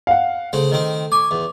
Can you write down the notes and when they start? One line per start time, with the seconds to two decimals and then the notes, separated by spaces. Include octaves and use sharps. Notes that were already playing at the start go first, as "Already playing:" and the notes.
0.07 F5 F#5
0.53 C#3 A3 C4
0.72 D#3 C4
1.12 G#5 C#6 D6
1.31 E2